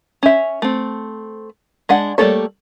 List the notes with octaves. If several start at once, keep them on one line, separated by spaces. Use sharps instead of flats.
C#4 E5
A3 C4
G#3 D4 F#5
G3 A3 A#3 A4 C#5